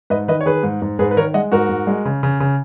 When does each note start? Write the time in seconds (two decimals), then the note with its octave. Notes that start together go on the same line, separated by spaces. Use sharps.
0.10 G#2 B4 D#5
0.28 D#3 B4 D#5
0.41 C#5
0.46 D#3 G#4 B4
0.63 G#2
0.82 G#2
0.99 G#2 G#4 B4
1.11 B4
1.17 D#3 A#4 C#5
1.34 G#3 D#5 F#5
1.52 G#2 F#4 A#4
1.69 G#2
1.87 G#3
2.05 C#3
2.23 C#3
2.40 C#3